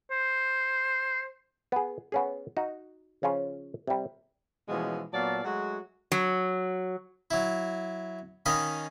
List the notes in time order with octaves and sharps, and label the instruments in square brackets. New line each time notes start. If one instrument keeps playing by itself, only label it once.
[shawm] C5
[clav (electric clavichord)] B3 G#4
B3 C#4 G#4
D#4 F#4
C#3 F3 C#4 F4
C3 G3
[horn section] B2 E3 F3 G#3 A3 C#4
A#2 F#3 B3 D5 F5 A5
F#3 G#3 A3 F#4
[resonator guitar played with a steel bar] F#3
[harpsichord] F#3 E4
D#3 C#4 D#5 F5 B5